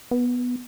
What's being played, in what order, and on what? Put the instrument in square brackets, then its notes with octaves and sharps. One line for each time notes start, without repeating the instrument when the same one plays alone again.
[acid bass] B3